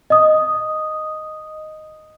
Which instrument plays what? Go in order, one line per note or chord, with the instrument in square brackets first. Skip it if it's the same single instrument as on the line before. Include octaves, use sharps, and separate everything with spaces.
[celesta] D#5 D#6